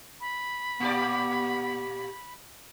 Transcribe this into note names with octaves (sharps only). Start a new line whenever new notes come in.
B5
A#2 B3 G4 D5